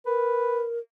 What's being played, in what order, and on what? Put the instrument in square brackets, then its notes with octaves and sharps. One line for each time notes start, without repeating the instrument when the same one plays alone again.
[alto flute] A#4 [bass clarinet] B4